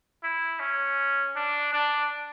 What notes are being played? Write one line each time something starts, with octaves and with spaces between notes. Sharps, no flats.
E4
C#4
D4
D4